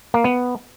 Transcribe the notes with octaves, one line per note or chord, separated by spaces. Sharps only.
A#3
B3